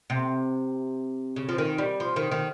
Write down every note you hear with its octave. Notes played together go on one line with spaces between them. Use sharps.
C3
C#3
F3
D#3
G3
F3
D#3
D#3